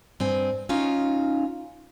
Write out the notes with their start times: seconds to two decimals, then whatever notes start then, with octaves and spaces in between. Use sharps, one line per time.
0.20 G2 C4 G#5
0.69 C#4 D#4 F4 F#4